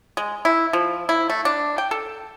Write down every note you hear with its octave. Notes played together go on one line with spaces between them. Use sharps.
G#3
E4
F3
E4
A3
D4
G5
A4